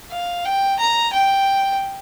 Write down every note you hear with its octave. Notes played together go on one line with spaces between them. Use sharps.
F5
G5
A#5
G5